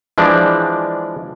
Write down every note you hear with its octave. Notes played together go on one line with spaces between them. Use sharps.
E3 F3 G#3 D4 D5